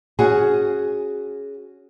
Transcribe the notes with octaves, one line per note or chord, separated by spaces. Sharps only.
C#4 F#4 G#4